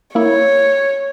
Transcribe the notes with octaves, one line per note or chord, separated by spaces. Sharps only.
A#3 E4 C#5